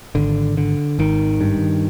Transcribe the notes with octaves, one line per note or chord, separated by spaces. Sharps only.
G#1 D3
D3
G#1 D#3
G2